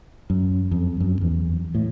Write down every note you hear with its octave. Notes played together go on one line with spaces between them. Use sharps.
F#2
F2
F#2
E2
A2